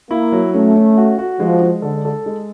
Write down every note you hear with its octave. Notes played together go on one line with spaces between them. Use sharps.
A#3 E4
F#3
A3 C#4
C#4
F#4
F#4
F3 G#3
G#3
D3 A4
A4
G#3